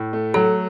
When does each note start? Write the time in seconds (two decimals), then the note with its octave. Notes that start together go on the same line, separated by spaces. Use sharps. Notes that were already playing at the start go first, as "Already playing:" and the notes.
Already playing: A2
0.13 A3
0.34 F#3 A4